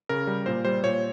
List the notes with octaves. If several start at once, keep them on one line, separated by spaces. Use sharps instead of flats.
C#3 A#4
G3
A#2 C5
G3 C5
A#2 C#5